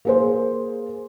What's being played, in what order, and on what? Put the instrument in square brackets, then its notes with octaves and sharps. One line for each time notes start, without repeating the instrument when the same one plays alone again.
[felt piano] A#3 G#4 C5